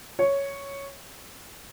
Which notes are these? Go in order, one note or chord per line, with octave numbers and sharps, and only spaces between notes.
C#5